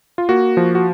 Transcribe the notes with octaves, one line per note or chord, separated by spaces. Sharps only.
F4
A#3 F#4
F3
F#4